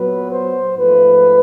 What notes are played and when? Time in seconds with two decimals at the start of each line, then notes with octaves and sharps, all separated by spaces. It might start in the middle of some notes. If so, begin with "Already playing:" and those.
Already playing: A#2 F#3 B3 B4
0.32 C5
0.76 G#2 F3 A3 B4